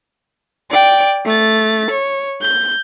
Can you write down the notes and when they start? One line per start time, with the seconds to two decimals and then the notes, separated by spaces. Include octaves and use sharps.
0.70 D5 G5
1.25 A3 A6
1.91 C#5
2.41 G6